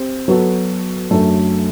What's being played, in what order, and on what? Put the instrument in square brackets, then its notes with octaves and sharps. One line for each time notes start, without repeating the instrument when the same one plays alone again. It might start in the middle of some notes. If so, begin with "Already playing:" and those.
Already playing: [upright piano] C4 G4
F#3 B3 F#4 A4
F#2 F#3 A3 D4 A4